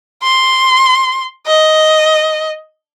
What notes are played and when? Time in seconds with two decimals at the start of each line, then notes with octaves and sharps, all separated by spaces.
0.23 C6
1.47 D#5